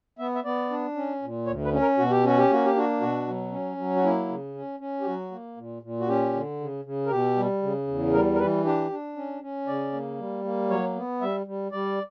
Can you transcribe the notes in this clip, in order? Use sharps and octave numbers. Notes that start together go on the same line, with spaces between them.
B3 E5
E5
B3 D5
D4
C#4
A#2
D2 C#5
B4
C#4
A#4
B2 F#4
G4
C#4 F#4
G4
A#3 F#4
G4
D4 F#4
B2 F#4
F#3
C#4
F#3
F#4
A#3 E4
C#3
C#4
C#4
G4
F#3 F#4
A#3
A#2
A#2
F#4
C#4 G4
D3
C#3
C#3
A#4
B2 G4
G3
C#3
E2
G3 A#4
A#4
E3 B4
D4 G4
D4
C#4
C#4
C#3 D5
A#3
G3
A#3
F#3 C#5
B3
G3 E5
G3
G3 D5